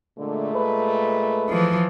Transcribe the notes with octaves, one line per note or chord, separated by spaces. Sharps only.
A#2 D3 G#3 A3
B4
E3 F3